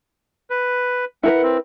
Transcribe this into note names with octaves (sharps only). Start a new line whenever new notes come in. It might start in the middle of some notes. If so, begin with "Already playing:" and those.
B4
E4 A#4 B4 F#5
C4